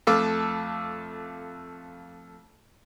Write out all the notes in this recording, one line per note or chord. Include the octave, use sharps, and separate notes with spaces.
F2 A3 A4 F5 D6